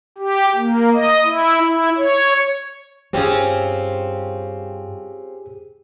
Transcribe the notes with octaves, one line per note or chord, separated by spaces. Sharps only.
G4
A#3
D#5
E4
E4
C#5
G2 C4 C#4 F4 G4 G#4